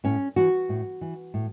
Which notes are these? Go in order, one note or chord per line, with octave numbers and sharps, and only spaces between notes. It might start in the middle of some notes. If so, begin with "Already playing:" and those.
A2 C#4
E3 F#4
A2
E3
A2